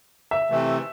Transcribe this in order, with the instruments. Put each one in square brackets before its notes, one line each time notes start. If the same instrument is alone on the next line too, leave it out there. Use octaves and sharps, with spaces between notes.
[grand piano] E5
[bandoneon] C3 E3 A3